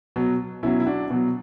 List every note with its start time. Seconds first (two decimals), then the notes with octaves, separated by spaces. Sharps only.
0.16 B2 F#3
0.63 B2 F#3 C#4 E4
0.80 E4
0.86 D4 F#4
1.10 B2 F#3